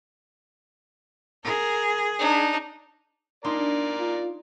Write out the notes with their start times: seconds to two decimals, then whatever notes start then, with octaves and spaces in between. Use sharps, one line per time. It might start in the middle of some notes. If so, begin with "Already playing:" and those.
1.44 G#4 A#4
2.19 D4 D#4
3.45 D4 D#4 A#4 D5 C6
3.99 F4